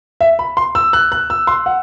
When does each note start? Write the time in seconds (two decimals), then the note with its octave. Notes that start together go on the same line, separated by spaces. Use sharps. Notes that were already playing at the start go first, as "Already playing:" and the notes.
0.21 E5
0.39 B5
0.57 C6
0.75 E6
0.93 F#6
1.12 F#6
1.30 E6
1.47 C6
1.66 F#5